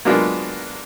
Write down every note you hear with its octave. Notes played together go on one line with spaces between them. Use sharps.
F#3 G#3 A#3 B3 D4 F4